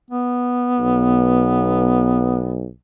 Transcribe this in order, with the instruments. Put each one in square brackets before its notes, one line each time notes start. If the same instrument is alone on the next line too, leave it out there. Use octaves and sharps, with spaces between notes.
[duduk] B3
[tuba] B1